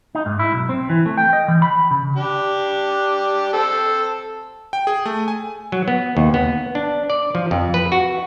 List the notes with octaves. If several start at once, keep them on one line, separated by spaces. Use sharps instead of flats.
D#4
G#2
E4
B1
C4
E3
A3
G5
D#5
E3
B5
C#3
D4 G4
C4 A4
G5
G#4
A3
G#5
F#3
B3
D#2
B3
D4
D5
F3
F2
B4
F#4